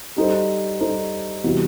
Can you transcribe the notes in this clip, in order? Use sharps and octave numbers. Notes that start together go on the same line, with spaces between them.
G3 D#4 A4 C5
G3 D#4 A4 C5
C3 E3 G3 B3 F#4